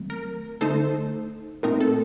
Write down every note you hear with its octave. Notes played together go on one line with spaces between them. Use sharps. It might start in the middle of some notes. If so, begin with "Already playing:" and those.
Already playing: D#3 F#3 A3 C4
A#4
D3 A3 D#4 A4 C5
A#2 A3 C4 D#4 A#4
A4